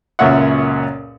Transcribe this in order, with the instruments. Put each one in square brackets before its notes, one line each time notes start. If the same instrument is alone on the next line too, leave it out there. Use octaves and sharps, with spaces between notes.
[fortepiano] C#2 F#2 A#2 C#5 E5 F#5